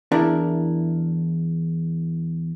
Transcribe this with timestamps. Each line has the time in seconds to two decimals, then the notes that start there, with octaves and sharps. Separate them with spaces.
0.12 E2 D4 E4 A#4